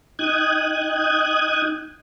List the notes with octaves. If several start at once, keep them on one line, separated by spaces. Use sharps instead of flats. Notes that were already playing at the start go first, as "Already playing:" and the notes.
D#4 G5 D#6 F#6 G#6